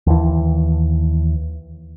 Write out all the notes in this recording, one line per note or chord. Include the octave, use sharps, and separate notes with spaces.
D#2 E3